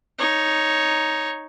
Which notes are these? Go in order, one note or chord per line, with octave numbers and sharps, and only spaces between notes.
D#4 C#5